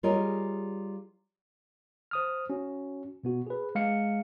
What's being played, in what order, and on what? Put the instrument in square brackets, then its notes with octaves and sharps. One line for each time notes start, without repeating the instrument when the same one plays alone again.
[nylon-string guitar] G3 F4 G#4 A#4 C#5 D#5
[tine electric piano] C5 D#6 F6
C#4 F#4
B2 B3 F#4
G#4 B4
G#3 F5 C#7